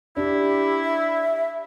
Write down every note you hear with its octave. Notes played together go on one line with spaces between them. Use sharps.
D4 E4 G4
E5